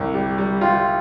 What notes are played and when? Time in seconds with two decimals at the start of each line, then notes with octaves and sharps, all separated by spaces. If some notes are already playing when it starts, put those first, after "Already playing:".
Already playing: C2
0.14 G3
0.38 G3
0.61 G3 F4